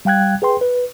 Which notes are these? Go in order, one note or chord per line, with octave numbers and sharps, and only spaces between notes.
G3 F5 G5 F#6 G#6
G#4 B4 G5 C6
B4